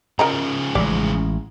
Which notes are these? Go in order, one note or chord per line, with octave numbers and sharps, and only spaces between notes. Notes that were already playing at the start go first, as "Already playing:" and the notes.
C#3 F3 A#4 D#5 A#5
A1 G#3 D5